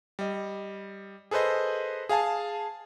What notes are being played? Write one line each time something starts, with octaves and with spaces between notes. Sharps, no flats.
G3 D#5
G#4 A4 B4 C5 D#5
G#4 F5 G#5 A5